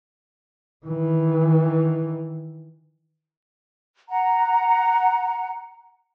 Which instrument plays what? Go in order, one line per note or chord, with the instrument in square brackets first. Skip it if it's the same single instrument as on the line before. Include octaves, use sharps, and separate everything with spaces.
[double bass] D#3 E3
[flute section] F#5 A#5